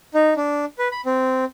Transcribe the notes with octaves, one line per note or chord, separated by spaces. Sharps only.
D#4
D4
B4
B5
C4